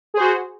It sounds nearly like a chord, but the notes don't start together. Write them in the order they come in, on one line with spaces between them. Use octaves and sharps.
G#4 C5 F#4